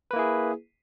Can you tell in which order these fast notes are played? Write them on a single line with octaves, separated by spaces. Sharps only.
B4 A#3 E4 G#4